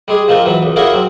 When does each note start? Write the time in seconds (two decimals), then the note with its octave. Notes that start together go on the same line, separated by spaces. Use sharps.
0.08 G3 G#3 G#4
0.28 F3 G#3 A#3 C4
0.46 E3 F#3
0.63 C#2
0.76 A#3 E4 F#4 G#4 A#4 C#5
0.93 F#3 C4